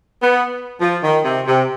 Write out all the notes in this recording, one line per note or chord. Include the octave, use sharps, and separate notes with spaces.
B3
F3
D#3
C3
C3